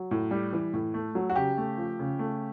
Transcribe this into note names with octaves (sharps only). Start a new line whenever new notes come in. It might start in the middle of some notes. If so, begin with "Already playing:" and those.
Already playing: F#3
A2
G3
E3
A2
A3
F#3
F#4
C#3 G4
A3
F3
C#3
A3